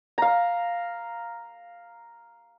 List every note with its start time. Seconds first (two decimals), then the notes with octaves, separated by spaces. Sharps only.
0.18 F5 A#5